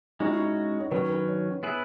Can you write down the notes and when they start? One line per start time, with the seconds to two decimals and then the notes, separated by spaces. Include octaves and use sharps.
0.20 G#3 C#4 D#4 F#4
0.29 E4
0.37 D#4
0.80 C#5
0.91 D#3 F#3 C#4 B4
1.09 B4
1.28 C#5
1.63 B3 E4 G#4 B4